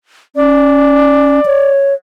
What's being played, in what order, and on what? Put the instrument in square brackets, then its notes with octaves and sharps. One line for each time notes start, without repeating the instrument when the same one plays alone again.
[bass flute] C#4 [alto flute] D5
[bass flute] C#5